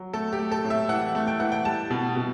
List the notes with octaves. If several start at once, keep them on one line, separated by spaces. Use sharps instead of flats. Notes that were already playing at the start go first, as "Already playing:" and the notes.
Already playing: F#3
A3 A4
G4
A3
A4
A2
E5
E3 F#5
A3
G5
E3 F#5
G5
G3 A5
B2
B2